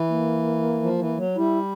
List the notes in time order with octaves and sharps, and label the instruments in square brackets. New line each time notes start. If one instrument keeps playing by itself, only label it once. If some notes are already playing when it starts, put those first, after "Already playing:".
Already playing: [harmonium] E3
[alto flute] A#3
[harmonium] F3
E3
F#3
[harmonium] G3 [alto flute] E4